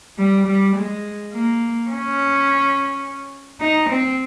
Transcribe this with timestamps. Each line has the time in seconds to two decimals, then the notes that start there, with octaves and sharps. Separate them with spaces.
0.18 G3
0.47 G3
0.76 G#3
1.33 A#3
1.90 C#4
3.61 D#4
3.90 C4